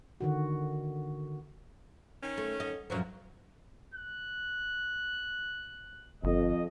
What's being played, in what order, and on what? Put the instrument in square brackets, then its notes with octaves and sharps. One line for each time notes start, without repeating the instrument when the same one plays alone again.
[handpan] D3 D#3 F#4
[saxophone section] D#3 C#4
[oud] A3
D#5
[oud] F#2 A#2 F3 [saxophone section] F#3
[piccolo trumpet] F#6
[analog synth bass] G1 [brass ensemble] F2 D#5